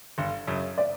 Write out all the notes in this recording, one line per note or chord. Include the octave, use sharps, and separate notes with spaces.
G1
F#2 C#3
D5